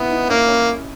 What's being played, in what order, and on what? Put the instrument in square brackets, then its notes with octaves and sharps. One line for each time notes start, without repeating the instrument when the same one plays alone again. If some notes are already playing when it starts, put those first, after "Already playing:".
Already playing: [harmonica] B3 [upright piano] C#4 E4
[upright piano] D#4
[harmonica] A#3 [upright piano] C#4
[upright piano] C#4